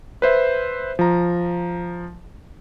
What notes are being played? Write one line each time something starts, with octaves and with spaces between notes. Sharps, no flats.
B4 C5 E5
F3 A#5